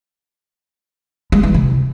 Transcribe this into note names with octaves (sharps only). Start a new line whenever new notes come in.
G#3
E3
C3